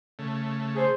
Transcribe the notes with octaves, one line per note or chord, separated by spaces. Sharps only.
C#3 A3
G#4 C5